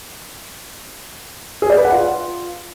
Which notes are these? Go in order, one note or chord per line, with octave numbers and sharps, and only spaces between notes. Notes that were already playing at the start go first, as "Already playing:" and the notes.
G#4
D5
B4
F#5
F4